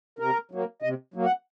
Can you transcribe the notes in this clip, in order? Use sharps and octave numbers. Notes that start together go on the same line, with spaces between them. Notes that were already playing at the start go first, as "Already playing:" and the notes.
C3 A#4
F#3 A#3
C3 D#5
F#3 A#3
F#5